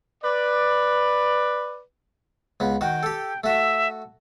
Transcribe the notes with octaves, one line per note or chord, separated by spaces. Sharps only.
B4 D5
C#2 B3
D#3 F#4 G5
G4 A4
A3 F#4 E5